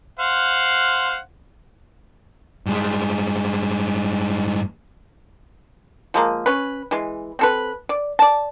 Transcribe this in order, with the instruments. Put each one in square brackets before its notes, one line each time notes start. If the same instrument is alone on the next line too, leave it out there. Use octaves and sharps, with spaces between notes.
[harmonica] C5 F5 F#5
[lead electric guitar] G2 G#3
[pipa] F3 G#3 A#3
C#4 B4
E3 G#3
C4 A4 B4
D5
D5 A5